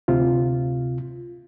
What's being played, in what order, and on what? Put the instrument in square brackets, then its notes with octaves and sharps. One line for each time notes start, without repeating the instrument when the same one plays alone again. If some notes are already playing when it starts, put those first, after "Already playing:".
[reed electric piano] D2 C3 F4